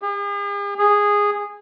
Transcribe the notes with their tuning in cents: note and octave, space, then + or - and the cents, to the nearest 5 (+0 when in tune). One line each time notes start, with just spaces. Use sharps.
G#4 -45
G#4 -10